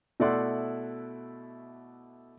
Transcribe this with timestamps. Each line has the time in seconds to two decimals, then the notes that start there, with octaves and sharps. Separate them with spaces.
0.20 B2 A3 E4 D5 F#5 C6